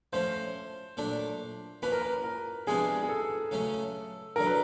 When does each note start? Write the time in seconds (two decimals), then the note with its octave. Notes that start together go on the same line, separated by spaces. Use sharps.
0.13 F3 A3 C#4 C5
0.97 A#2 F#3 A3 D4
1.82 F3 A#3 C#4 B4
1.92 A#4
2.02 B4
2.24 A#4
2.67 C3 F3 G#3 B3 D4 G#4
3.03 G#4
3.09 A4
3.51 C#3 F#3 A3 C#4
4.36 F#2 D3 F#3 A#4
4.46 B4